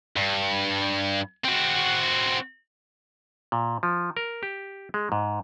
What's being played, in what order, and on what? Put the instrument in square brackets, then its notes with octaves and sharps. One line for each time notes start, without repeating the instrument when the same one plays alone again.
[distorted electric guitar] G2
C4 F#4
[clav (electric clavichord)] A#2
F3
A#4
G4
G#3
G#2